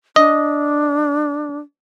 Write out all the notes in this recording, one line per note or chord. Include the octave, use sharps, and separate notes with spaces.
D4 D#5